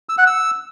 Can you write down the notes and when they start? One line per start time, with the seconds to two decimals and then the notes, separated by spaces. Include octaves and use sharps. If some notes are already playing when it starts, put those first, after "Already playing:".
0.09 E6
0.18 F#5
0.27 E6